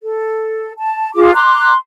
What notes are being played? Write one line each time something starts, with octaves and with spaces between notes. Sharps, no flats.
A4
A5
F4 G#4 D6
A#5 C6 D6 F#6